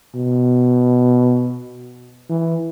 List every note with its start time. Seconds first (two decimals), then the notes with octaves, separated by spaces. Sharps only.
0.15 B2
2.29 E3